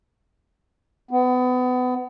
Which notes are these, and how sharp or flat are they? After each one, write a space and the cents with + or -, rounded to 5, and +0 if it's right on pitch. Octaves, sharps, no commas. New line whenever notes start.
B3 +30